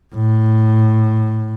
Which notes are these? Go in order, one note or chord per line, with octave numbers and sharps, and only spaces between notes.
A2